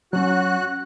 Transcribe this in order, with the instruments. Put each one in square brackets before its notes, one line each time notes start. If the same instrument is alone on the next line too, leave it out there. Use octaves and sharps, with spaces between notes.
[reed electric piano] F#3 C#4 [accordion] F#4 F#6